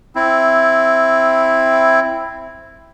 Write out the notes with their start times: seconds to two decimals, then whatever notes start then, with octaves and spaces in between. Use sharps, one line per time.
0.15 C4 E4